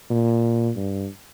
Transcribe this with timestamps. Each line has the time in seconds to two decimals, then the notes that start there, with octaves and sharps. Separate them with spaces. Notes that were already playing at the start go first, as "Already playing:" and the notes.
0.10 A#2
0.76 G2